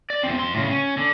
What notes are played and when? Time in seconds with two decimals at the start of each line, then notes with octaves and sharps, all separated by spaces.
0.10 D5
0.23 E2 C4
0.39 F2 C6
0.54 A2 C#3
0.70 C#4
0.97 D3